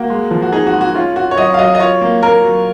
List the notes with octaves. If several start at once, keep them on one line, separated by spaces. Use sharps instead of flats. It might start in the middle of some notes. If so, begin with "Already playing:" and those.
Already playing: A#3 F#4
G#3
F3
F#4
D#4 G#4
F#4
G#3
F#4
C#4 F4
F4 F#4
C#5
F#3 D#5
F5
F#3 D#5
D#5
F4 C#5
A#3
A#3 A#4
F#3